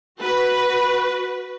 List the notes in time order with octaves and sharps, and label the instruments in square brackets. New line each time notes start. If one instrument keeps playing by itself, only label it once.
[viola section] F#4 B4